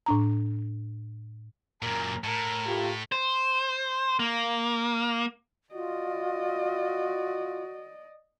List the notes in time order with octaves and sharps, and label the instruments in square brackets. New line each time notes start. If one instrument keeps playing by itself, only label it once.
[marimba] A2 D4 A#5
[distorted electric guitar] F#2 A#2 [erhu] A#4
[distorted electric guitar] A2 [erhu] A#4
[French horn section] A3 F4 G4
[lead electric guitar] C5
A#3
[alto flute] F4 [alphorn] F#4 [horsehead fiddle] D5 D#5